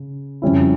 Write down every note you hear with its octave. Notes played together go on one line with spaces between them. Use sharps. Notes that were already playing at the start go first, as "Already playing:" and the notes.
Already playing: C#3
F2 C#3 G3 C#4 E4